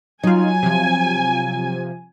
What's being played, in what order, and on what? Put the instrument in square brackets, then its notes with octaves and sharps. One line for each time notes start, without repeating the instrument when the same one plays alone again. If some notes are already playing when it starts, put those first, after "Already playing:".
[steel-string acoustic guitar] F#3 [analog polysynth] D#4 F4 [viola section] G#5
[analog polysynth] C3 F3